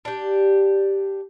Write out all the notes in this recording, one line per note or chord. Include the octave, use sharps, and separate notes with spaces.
D4 G4